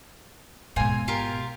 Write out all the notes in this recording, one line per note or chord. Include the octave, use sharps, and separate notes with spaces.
G#2 B2 C4 F5 G#5
F4 G4 A#4